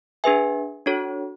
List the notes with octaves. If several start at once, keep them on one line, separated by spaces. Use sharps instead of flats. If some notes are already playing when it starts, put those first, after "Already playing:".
D4 G#4 B4 E5 G#5
D4 F#4 A4 C#5